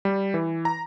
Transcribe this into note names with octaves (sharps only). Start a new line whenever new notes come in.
G3
E3
A#5